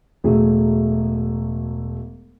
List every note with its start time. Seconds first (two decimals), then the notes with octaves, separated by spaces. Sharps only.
0.24 E1 A2 F#3 A3 G#4 E5